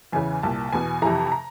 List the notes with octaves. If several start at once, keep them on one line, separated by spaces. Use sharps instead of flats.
E2 C#3 E3 G#5
C2 A#2 A5
E2 B2 G#5
F2 C3 E3 A#5
A#5